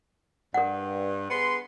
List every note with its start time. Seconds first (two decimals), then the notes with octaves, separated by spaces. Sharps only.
0.54 G2 A#4 F#5
1.30 B3 G#4 C6